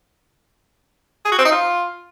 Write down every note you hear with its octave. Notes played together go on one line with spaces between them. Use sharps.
G#4
F#4
C4
D#4
F4